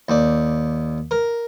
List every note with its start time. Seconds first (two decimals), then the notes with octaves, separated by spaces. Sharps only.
0.09 D#2 D5
1.11 A#4